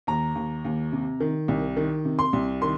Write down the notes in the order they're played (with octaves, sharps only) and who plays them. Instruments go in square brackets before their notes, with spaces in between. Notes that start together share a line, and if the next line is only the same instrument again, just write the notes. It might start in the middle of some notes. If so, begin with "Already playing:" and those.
[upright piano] D#2 A#5
D#2
D#2
C3
D#3
C2
D#3
C3
C6
C2
D#3 C6